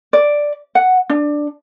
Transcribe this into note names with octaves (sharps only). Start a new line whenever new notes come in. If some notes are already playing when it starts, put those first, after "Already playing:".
D5
F#5
D4